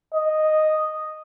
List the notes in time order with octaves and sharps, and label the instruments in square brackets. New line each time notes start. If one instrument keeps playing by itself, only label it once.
[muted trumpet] D#5